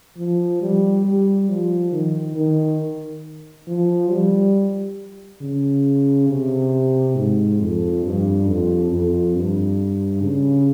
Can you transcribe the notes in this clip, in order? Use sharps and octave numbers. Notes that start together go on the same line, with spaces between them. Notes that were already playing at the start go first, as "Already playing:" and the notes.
F3
G3
G3
F3
D#3
D#3
F3
G3
C#3
C3
G#2
F2
G2
F2
F2
G2
C#3